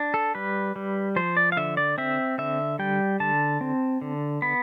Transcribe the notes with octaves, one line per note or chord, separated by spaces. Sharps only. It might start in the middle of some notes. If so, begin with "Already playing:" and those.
Already playing: D4
A4
G3 B4
G3
F3 C5
D5
F5
D3 E5
D5
C4 E5
D3 E5
G3 G5
D3 A5
C4
D3
B3 B5